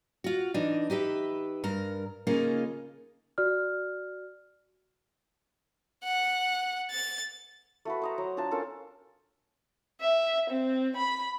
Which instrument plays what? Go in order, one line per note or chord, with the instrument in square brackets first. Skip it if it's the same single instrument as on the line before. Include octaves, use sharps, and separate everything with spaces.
[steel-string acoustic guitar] F4 F#4
E3 D4 D#4
D#4 G4 B4 E5
G2 A#4
C#3 A#3 C#4 D#4 F4 G#4
[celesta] F#4 D5 F6
[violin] F#5
A6
[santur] A3 F#4 B4
C5 D#5 A#5
F#3
D4 F4 C5 A5
C#4 F4 A4 A#4
[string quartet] E5
C4
B5